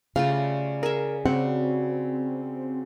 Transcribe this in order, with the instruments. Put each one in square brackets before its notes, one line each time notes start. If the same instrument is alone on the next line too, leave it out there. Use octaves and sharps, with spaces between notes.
[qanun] C#3 A3 F4 [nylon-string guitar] F5
[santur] G3
[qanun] G#4 E5 [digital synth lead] A#4
[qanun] C#3 [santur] F#3 G3 F#4 [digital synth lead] C4 [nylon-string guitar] F#5